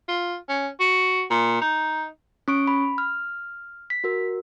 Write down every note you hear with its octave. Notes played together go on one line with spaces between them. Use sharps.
F4
C#4
F#4
A#2
D#4
C#4 C#6 D7
B5
F6
B6
F#4 A#4